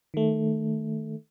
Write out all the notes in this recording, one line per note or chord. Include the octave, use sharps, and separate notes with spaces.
D#3 A3